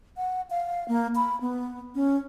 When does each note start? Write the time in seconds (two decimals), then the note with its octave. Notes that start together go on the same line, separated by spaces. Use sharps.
0.17 F#5
0.50 F5
0.88 A#3
1.16 B5
1.41 B3
1.95 C#4